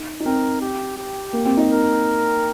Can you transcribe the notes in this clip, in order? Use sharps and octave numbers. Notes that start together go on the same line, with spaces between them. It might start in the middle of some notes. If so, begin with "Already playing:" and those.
Already playing: D#4
D#4
C4 A#4
G4
G4
A#3
C4
D#4
A#4